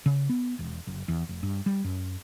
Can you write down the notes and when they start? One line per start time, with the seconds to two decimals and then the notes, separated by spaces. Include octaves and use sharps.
0.06 C#3
0.29 B3
0.59 E1
0.87 F#1
1.08 E2
1.29 F1
1.43 G2
1.66 G3
1.84 F#2